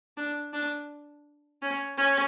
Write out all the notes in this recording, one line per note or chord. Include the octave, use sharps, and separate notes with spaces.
D4
D4
C#4
C#4